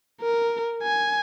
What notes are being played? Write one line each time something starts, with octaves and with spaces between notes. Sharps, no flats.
A#4
G#5